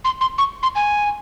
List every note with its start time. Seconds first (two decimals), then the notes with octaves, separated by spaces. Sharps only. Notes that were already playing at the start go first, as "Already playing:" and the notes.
0.05 C6
0.21 C6
0.38 C#6
0.63 C6
0.75 G#5